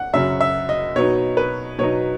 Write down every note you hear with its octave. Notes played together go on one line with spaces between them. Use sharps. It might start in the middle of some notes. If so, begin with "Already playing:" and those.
Already playing: F#5
F#2 C#3 F#3 E5
E5
D#5
B2 F#3 B3 D#4 C#5
B4
B2 F#3 B3 D#4 C#5